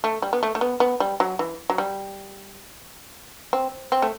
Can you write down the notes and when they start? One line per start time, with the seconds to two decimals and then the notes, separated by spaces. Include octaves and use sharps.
0.04 A3
0.22 G3
0.33 B3
0.43 A3
0.55 A3
0.61 B3
0.80 B3
1.00 G3
1.20 F#3
1.39 E3
1.70 F#3
1.78 G3
3.53 C4
3.92 C4
4.02 A3